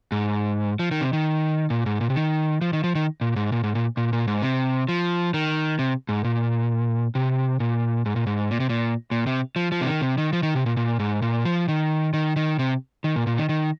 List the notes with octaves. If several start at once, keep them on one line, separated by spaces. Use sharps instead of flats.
G#2
F3
D#3
C3
D#3
A#2
G#2
A#2
C3
D#3
F3
D#3
F3
D#3
A#2
G#2
A#2
G#2
A#2
A#2
A#2
G#2
C3
F3
D#3
C3
G#2
A#2
C3
A#2
G#2
A#2
G#2
A#2
C3
A#2
A#2
C3
F3
F3
C3
D#3
C3
D#3
F3
D#3
C3
A#2
A#2
G#2
A#2
F3
D#3
D#3
D#3
C3
D#3
A#2
A#2
D#3
D#3